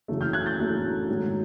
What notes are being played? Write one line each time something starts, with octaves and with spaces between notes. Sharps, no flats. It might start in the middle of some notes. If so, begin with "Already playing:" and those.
F#1 E2 C#3 F#3 A3
F6 G6
F#6 G#6
G6 A6
F#1 E2 C#3 F#3 A3
G#2 D#3 F#3 A3